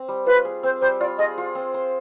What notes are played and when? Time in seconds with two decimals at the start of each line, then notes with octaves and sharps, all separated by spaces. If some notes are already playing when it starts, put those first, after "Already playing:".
Already playing: C4
0.08 G3
0.26 F4 B4
0.45 G#4
0.63 C4 C5
0.81 G3 C5
1.00 F4 D5
1.18 G#4 D#5
1.38 F4
1.55 C4
1.74 C5